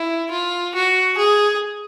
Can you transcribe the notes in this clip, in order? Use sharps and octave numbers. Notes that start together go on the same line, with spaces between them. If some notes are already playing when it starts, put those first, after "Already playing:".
Already playing: E4
F4
F#4
G#4